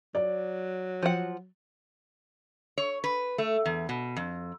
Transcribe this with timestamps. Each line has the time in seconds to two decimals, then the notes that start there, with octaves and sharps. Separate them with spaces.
0.15 F#3 D5
1.03 F3 F#5
2.78 C#5
3.04 B4
3.38 A3
3.66 E2
3.89 B2
4.16 F2